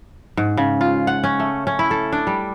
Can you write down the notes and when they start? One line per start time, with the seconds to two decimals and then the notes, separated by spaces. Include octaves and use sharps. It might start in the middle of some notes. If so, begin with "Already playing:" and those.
0.37 G#2
0.57 C#3
0.81 F4
1.07 F#5
1.24 C#4
1.39 A3
1.67 C#4
1.79 E4
1.91 A4
2.12 D4
2.27 G3